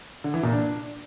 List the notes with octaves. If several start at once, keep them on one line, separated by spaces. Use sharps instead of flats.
D3
E3
A#2
D4